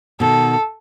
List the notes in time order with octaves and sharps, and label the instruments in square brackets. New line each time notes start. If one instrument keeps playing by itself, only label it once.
[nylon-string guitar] B2 D#3 [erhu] A4